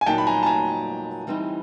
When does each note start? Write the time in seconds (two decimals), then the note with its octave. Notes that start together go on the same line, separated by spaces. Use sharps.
0.01 G#5
0.06 A#2 F#3 A#3 D#4 G5 A5
0.18 B5
0.27 G#5 A#5
0.43 A5
0.46 G#5 A#5
1.27 E3 G3 C4 D#4